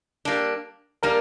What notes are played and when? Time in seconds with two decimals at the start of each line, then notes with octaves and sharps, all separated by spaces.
0.25 G3 A#3 D4
1.03 G3 A#3 D4 A#4